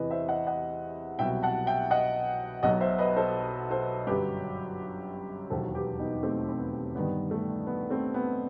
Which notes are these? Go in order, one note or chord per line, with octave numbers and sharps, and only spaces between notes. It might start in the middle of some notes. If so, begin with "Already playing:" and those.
Already playing: E2 C3 E3 B4 D#5
C5 E5
D#5 F#5
D#5 F#5
C2 B2 F#3 E5 G5
F#5 A5
E5 G5
D#5 F#5
B1 B2 F#3 D#5 F#5
C5 E5
B4 D#5
A4 C5
A4 C5
G1 F#2 F#3 G4 B4
E1 D#2 D#3 F#3 A4 C5
G4 B4
B3 D#4
A3 C4
C4
B3
G1 G2 D#3 B3
A3
B3
A3 C4
B3